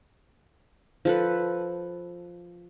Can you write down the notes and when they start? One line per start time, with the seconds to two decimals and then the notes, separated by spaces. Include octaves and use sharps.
1.05 F3 A4 B4